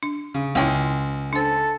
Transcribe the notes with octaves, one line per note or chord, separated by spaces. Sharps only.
D4
C#3
C#2 E4 C#5 E5 G5 C6
D4 A4 C5